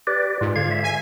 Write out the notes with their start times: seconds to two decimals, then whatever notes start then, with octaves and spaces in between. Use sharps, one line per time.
0.07 G4 B4 D5
0.41 G#2 F4
0.56 D3 F5 G#6
0.71 E5
0.84 G#5